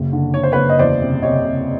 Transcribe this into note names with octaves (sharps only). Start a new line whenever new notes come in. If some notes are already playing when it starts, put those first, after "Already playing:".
Already playing: F#1 C#3
D3
D3 C#5
C5
B4 C#5
F#1
D#5
E2 C5 D5
C3
C3 C#5 D#5
C3